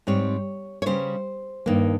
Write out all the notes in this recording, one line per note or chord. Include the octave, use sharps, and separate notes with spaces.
G#2 G3 C4 C#5
C#5
C#3 G3 C#4 C5
G2 D#3 A#3